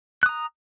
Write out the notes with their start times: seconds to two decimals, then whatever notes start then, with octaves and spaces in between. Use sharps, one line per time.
0.23 F#6
0.26 D#6
0.29 A#5